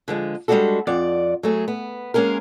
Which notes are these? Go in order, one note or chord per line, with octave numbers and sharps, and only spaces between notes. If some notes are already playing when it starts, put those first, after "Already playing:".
D3 F3 G#3
G3 G#3 B3 D4 F#4 A4
F2 D5 F#5
F#3 A3 G#4
B3
G#3 A#3 C#4 G#4 A#4